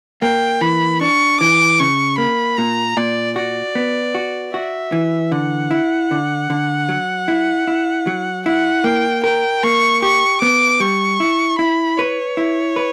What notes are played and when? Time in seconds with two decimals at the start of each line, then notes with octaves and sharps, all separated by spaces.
0.22 A#3 G5
0.61 E3 B5
1.01 D4 C#6
1.40 E3 D6
1.79 C#3 C#6
2.18 A#3 B5
2.57 A#2 A#5
2.97 A#2 D5
3.36 F#4 D5
3.75 B3
4.15 F#4
4.53 F#4 E5
4.92 E3
5.32 D3 F#5
5.71 E4
6.11 D3
6.50 D3
6.89 F#3
7.28 E4
7.67 E4
8.07 F#3
8.46 E4 F#5
8.84 A#3 G5
9.24 A#4 G5
9.63 A#3 C#6
10.02 G4 C#6
10.41 B3 D6
10.80 G3 C#6
11.20 E4
11.59 E4 B5
11.98 B4 C#5
12.37 E4
12.76 B4